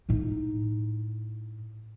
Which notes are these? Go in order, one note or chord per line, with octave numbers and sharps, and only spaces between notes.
A2 D#4